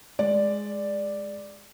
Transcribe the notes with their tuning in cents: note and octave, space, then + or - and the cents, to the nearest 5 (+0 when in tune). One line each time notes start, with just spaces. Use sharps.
G#3 +0 D5 +0